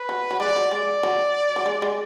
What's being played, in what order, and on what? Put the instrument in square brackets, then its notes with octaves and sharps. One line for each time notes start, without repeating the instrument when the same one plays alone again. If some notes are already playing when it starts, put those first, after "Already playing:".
Already playing: [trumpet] B4
[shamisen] F#3
F#3
[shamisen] G#3 [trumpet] D5
[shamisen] F#3
[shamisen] G#3 [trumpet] D5
[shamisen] F#3
F#3
G#3
G#3